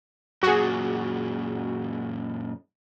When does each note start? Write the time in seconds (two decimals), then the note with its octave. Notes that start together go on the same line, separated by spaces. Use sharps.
0.43 F#2 A#2 F#4 G#4